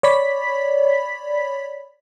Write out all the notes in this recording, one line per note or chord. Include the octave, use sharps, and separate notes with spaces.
C#5 D5 B5 B6